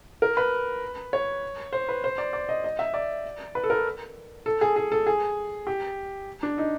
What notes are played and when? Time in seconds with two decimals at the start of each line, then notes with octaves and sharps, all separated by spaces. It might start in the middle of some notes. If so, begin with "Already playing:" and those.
0.22 A#4
0.37 B4
1.13 C#5
1.73 C5
1.89 B4
2.04 C5
2.18 D5
2.33 D5
2.49 D#5
2.64 D#5
2.79 E5
2.94 D5
3.55 B4
3.64 A4
3.70 A#4
4.46 A4
4.61 G#4
4.76 G#4
4.92 A4
5.07 G#4
5.67 G4
6.43 D4
6.58 D#4